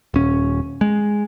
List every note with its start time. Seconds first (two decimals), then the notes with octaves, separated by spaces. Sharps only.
0.14 D#1 C#4
0.81 G#3